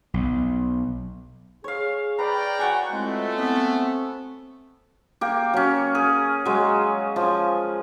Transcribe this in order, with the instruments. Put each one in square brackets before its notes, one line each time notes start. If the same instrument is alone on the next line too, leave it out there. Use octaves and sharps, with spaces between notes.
[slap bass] B1
[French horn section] G#4 [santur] C#5 F5
[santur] B4 [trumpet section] D5 G5 [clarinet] A#5
[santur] F#4 F#5 G#5
[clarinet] G#3 [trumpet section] A3 [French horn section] C4 E4 F4
[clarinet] B3 [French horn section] C4 [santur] E5
[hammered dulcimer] A#3 G4
F#3 C#4
G#4
F#3 G#3
F3